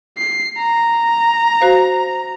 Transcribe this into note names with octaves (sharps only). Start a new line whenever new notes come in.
C7
A#5
F#4 C5 F5